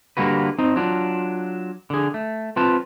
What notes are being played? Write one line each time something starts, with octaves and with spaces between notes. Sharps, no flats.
D3 G3 A#3 F#4 B4
C4 D#4
F#3 D4 F4
D3 G#4
A3
C4 F4 B4 A5